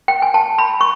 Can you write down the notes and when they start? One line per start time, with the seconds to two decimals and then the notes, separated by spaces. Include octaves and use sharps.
0.08 G5
0.22 G#5
0.34 A5
0.58 B5
0.81 C#6